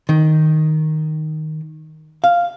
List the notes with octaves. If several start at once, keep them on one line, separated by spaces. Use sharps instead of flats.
D#3
F5